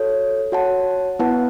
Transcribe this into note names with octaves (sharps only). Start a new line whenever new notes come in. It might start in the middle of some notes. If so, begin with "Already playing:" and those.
Already playing: F#4 A4 C#5
F#4 C#5 F#5 A5
B3 E4 B4 F#5 A5